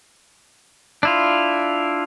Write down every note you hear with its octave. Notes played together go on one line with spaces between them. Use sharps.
D4 E4 F4